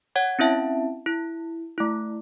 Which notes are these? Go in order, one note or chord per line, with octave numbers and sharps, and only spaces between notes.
C#5 F#5 G#6
C4 C#4 E4 E5 A5
E4
A3 E4